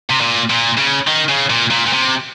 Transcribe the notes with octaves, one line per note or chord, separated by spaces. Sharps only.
C3
A#2
A#2
C#3
D#3
C#3
A#2
A#2
A#2
C3